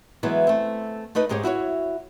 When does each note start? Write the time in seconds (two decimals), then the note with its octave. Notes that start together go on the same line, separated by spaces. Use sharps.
0.23 E3 F#3 G#3 B3 E4
0.47 A3 C4
1.15 A3 D#4 B4 D#5
1.29 G#2 G#3 G4 G#4 C#5
1.43 E4 F#4 A#4 C#5